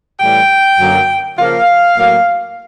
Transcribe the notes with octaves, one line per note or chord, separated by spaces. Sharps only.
A2 E3 G3 G5
F#2 D3 F#3 A#3
C#3 F3 A#3 F5
A2 F#3 A#3